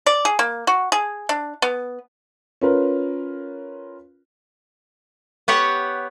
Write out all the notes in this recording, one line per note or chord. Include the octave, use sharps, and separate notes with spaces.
D5
G#4
A#3
F#4
G#4
D4
B3
C#4 F4 A#4 B4
B3 G4 C#5 F#5